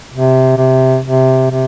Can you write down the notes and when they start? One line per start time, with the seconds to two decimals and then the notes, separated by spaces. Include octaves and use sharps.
0.12 C3
0.57 C3
1.05 C3
1.50 C3